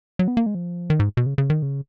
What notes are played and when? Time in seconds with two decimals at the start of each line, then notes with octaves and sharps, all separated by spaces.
0.19 F#3
0.28 B3
0.37 A#3
0.46 G#3
0.55 F3
0.90 D#3
1.00 G#2
1.17 B2
1.26 C#3
1.38 C#3
1.50 D#3
1.62 C#3